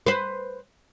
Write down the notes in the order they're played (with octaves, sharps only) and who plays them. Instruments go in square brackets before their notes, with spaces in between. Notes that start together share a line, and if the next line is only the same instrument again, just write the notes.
[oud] B4 C5